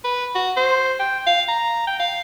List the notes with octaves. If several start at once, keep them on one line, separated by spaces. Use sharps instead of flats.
B4
F#4
C5
G5
F5
A#5
G5
F5